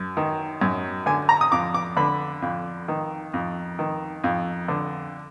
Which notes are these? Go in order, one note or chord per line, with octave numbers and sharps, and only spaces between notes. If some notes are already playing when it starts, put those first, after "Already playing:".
Already playing: F#2
D#3
F#2
D3 G#5
A#5
D#6
F2 D6
D6
D3 B5
F2
D#3
F2
D#3
F2
D3